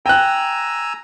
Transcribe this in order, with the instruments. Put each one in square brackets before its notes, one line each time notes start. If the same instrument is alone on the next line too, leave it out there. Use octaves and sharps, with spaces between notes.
[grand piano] G5 F#6 [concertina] G#5 A#5 E6